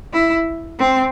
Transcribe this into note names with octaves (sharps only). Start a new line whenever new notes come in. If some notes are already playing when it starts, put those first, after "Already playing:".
E4
C4